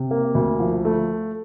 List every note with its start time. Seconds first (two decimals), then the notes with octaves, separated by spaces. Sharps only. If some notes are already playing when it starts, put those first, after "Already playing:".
Already playing: C3
0.11 A#3
0.35 D2
0.60 F3
0.85 A3